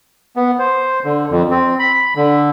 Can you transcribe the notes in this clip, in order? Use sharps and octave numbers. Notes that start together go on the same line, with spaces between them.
B3
C5
D3
F2
C4
B5
D3